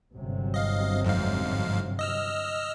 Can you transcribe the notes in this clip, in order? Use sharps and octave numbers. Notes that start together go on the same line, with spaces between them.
G1 C3 F#3
D#5 F5
F2 G#2 F5
D#5 E6 F6